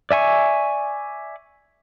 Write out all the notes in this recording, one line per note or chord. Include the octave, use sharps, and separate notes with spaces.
D5 E5 G#5 C#6